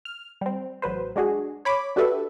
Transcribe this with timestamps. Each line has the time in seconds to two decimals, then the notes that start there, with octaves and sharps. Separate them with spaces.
0.05 F6
0.41 G3 C4
0.82 A1 F#3 B4 C5
1.16 G#3 D4 F#4 G#4
1.65 C#5 B5 D6
1.96 D4 F#4 G4 A4 B4 E5